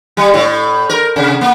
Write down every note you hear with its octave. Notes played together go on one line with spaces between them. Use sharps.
G3
A2
A#4
C3
A#3